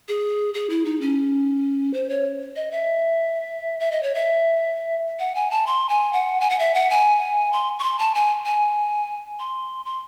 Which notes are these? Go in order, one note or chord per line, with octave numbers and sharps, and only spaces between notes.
G#4
G#4
E4
D#4
C#4
C5
C#5
D#5
E5
E5
D#5
C#5
E5
F#5
G#5
A5
C6
G#5
F#5
G#5
F#5
E5
F#5
G#5
C6
C#6
C6
A5
G#5
G#5
C6
C6